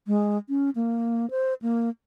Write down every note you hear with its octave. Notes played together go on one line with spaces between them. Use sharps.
G#3
C#4
A#3
C5
A#3